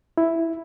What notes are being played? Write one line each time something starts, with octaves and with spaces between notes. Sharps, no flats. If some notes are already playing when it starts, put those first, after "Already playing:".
E4